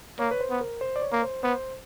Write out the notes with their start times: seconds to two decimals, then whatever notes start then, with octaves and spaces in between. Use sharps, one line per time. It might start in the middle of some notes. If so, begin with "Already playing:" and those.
0.19 A#3 C#5
0.31 B4
0.41 C5
0.51 B3
0.61 A#4
0.81 C5
0.96 D5
1.02 C#5
1.13 A#3
1.23 C5
1.43 B3 C5